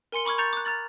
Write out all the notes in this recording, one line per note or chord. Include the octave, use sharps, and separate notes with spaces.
A#4 G#5 C6 C#7 G7
B5 C#6 D6 F6 G#6
A#5 C#6 G6 A6 C#7 F7
D6 F#6
A#5 F6 A6 F#7